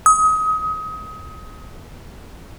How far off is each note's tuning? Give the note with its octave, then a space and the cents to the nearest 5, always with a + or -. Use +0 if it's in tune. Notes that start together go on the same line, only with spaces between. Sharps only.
D#6 +30